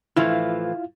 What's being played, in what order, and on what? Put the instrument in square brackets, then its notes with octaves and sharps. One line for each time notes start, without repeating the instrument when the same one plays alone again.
[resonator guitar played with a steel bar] A2 E3 F3 [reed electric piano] E4 F4 F5